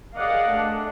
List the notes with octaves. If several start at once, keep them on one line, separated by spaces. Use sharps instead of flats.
G#4 A#4 D5 D#5 F5 F#5
A3 D4